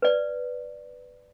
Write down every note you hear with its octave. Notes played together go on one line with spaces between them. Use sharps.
B4 D5